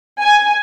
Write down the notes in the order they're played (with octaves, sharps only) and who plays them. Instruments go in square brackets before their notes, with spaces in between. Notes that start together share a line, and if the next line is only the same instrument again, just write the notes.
[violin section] G#5